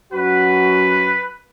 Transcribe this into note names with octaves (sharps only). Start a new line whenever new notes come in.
F#2 F#4 B4